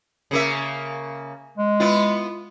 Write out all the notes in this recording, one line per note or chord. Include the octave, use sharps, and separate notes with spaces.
C#3 A#3 E5
G#3
B3 E4 F4